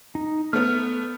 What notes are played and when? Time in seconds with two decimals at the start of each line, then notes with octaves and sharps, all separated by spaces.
0.15 D#4
0.53 A3 B3 F6